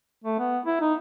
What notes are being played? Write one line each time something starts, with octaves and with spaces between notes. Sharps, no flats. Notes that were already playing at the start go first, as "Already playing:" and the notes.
A3
B3
E4
D#4